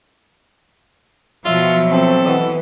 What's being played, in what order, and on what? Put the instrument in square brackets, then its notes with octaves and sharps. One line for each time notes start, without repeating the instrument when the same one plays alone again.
[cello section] B2 F3 F#3 [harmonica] F4 [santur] E5
[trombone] C4 [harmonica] A4 [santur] B5
[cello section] E3 [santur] B3 B4 D#5